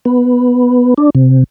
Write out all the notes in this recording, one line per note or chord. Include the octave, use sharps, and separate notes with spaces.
B3
D4
C3